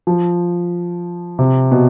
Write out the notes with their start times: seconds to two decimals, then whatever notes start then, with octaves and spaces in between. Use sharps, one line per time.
0.07 F3
1.39 C3
1.72 B2